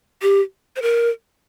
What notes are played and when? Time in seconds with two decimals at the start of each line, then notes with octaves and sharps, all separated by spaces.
0.22 G4
0.76 C5
0.82 A#4